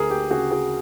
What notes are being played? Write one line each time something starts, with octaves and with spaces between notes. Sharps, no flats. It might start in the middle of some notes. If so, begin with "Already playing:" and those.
Already playing: D2 G#4 A#4
G4
C#3 F#4 G#4
F#4 G#4